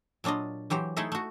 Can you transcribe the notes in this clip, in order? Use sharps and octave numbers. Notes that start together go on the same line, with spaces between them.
A#2 F#3 D4 F4 D#5
E3 F#3 G4 C5
A3 D#4 E4 G#4 A4 E5
A3 F#4